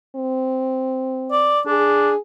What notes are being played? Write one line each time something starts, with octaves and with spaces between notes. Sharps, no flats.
C4
D5
D4 G#4